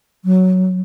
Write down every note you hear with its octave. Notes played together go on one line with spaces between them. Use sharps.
F#3